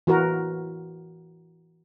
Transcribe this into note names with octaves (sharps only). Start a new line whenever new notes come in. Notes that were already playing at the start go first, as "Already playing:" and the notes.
E3 F#4 A#4